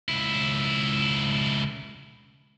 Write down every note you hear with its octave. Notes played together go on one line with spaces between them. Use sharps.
C#2 E4